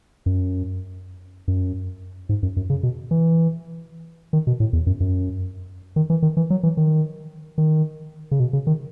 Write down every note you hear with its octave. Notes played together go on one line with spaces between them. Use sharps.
F#2
F#2
G#2
F#2
F#2
C#3
B2
E3
D#3
B2
A2
E2
F#2
F#2
D#3
E3
D#3
E3
F#3
E3
D#3
D#3
C#3
B2
C#3
D#3